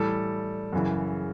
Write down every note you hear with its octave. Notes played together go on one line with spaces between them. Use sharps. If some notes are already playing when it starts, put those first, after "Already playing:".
Already playing: A2 E3 G3 A4
F#2 C#3 E3